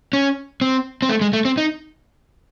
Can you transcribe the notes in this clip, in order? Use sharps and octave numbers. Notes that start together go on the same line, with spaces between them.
C#4
C4
C4
A3
G#3
A3
C4
D#4